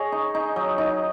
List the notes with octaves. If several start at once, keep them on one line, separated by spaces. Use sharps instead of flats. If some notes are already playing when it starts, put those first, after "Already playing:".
Already playing: G#4 C#5 D#5
D#4
D#4
F#3
D#4